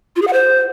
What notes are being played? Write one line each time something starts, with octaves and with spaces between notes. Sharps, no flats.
F4
G#4
F#5
C5